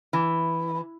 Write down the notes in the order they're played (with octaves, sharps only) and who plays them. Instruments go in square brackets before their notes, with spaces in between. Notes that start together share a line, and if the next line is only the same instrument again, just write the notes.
[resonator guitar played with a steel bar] E3